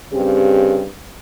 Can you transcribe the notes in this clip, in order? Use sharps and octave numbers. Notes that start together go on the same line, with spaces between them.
G2 C#3 C4 G4